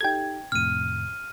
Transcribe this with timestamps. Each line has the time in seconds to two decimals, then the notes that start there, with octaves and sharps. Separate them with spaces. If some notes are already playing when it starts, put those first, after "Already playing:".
0.01 D#4 G4 A4 G5 G#6
0.52 F2 A2 C3 F6 D#7